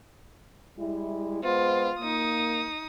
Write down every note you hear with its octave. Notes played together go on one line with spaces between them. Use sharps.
G3 G#3 E4
G#3 B3 F4 C5
A#3 D#4 D#6